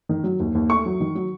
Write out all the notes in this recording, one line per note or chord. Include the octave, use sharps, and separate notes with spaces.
D#3
F#3
D#2
D#2
A3 C#6
F#3
D#3
F#3